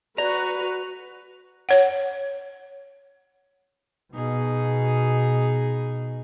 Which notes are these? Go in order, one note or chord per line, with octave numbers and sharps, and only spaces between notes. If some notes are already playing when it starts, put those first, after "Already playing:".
F#4 B4 D5 A#5
C#5 F#5
B2 D#4 G#4